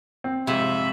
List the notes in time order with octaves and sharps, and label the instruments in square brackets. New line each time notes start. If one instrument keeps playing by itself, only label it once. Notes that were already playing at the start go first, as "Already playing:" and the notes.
[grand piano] C4
[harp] F2 G#2 [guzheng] C3 [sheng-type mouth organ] E5 B5